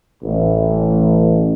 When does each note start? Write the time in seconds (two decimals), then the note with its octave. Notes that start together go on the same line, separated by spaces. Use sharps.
0.23 A1